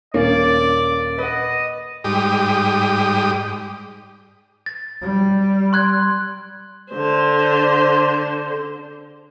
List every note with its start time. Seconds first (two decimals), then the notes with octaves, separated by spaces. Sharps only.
0.14 D#1 A#3 C#4 D5
1.18 B4 D#5 F#5
2.04 G#2 G3 G4 D#6
4.66 A6
5.02 G3
5.73 C6 F#6 G#6
6.92 D3 C5